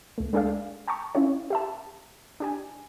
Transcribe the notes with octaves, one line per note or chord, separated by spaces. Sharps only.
C#2 A3
G#3 D4 G#4 A4 D5 F5
G5 A5 A#5 C#6
C#4 E4 F4 C#5
G4 E5 A5
D4 G4 G#5